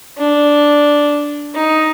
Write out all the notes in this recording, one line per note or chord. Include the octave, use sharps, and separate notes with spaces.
D4
D#4